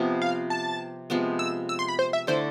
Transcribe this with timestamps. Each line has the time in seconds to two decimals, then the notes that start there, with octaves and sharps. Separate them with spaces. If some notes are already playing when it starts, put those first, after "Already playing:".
Already playing: C3 F3 B3
0.22 F5
0.50 A5
1.10 C3 F3 G#3 B3
1.39 E6
1.69 E6
1.79 C6
1.88 B5
1.99 C5
2.13 E5
2.27 D3 A3 E4 C5